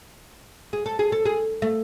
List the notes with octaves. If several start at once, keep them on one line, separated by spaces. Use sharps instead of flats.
G#4
A4
G#4
A4
G#4
A3